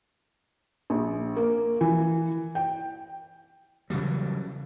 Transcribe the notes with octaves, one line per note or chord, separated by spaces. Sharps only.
A#1
A#3
E3
G5
C#3 E3 F#3 G3